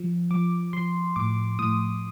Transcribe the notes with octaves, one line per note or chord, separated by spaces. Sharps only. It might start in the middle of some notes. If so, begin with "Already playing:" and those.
Already playing: F3
F3 D6
F3 C6
A2 D6
A2 D#6